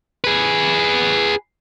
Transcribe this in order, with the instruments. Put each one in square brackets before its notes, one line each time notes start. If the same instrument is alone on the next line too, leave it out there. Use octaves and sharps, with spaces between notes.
[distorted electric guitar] G#4 B4